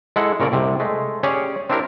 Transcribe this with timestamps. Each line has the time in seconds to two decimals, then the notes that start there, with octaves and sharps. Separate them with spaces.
0.16 G#3 E4 A4 F#5
0.40 A#2 C#3 A#4 C#5 D5
0.52 C2 C3
0.80 G#3 A3
1.23 C#4 G4 G#4 C#5 D5
1.70 C4 D4 E4 G4 A#4